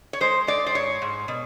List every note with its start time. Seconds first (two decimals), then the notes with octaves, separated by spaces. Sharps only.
0.13 C#5
0.21 G#3 C5
0.47 G#3 D5
0.66 C5
0.75 G#2 C#5
1.02 G#2
1.28 B2